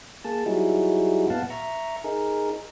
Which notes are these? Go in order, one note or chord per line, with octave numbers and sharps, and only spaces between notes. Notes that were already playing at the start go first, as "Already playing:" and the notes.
A#3 G#4 A5
F#3 G3 D#4 E4 F#4 G#4
A#2 B3 F5 F#5 A5
E5 A#5 C#6
D#4 G#4 A#4